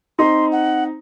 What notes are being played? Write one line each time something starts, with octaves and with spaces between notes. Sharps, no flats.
C4 D#4 C6
F#5